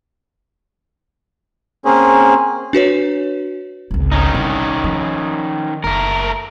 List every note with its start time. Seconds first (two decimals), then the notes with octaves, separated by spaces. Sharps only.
1.85 A#3 C4 C#4 G#4
2.73 D4 F#4 B4 C#5
3.91 G#1 C#2
4.12 D#3 C#4 D#4
4.34 C2
4.84 F3
5.84 F#1 A3 A#4